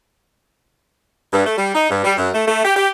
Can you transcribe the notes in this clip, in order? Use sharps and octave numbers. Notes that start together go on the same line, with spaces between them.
G2
A3
G3
D#4
G2
G3
F#2
A3
A3
G4
G4